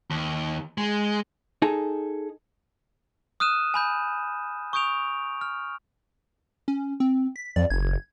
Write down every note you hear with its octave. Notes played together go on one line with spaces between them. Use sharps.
D#2
G#3
D#4 G#4 A4
D#6 F6 F#6 D#7 E7
G#5 B5 G6
C#6 D#6 G6 D7 F7
F6
C#4
C4
B6
F2 D5
F#1 G#6